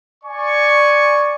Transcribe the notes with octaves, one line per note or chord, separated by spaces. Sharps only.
D5 G#5 C#6